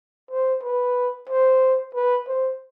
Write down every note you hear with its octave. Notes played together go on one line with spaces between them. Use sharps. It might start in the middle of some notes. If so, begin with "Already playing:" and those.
C5
B4
C5
B4
C5